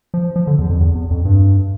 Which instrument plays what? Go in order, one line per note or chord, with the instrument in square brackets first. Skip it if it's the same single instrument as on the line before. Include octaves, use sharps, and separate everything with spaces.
[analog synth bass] F3
F3
D3
E2
F2
E2
E2
F2
G2